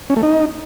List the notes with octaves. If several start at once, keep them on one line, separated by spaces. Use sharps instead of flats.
C#4
A3
D#4